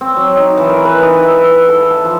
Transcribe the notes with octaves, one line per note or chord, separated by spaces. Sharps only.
C4
F#3
D#4
E3
A#4
B4
D#4
E5
E5
A4
A5
F3